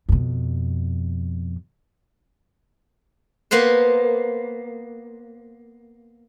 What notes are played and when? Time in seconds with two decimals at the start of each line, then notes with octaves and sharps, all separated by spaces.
0.09 F2 B2
3.51 A#3 B3 B4 C5